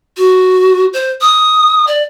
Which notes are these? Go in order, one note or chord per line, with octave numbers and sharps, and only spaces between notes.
F#4
C5
D#6
D5